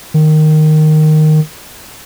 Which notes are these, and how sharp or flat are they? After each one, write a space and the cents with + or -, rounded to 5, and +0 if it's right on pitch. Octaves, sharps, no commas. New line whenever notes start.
D#3 -10